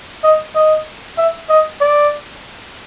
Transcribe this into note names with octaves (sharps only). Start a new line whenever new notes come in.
D#5
D#5
E5
D#5
D5